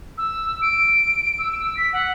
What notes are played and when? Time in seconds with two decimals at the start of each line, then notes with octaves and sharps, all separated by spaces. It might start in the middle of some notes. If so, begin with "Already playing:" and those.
0.18 E6
0.62 D7
1.38 E6
1.77 B6
1.93 F#5